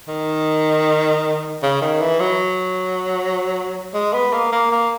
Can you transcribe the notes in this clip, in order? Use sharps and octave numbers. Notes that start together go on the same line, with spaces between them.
D#3
C#3
D#3
E3
F#3
G#3
B3
A#3
A#3
A#3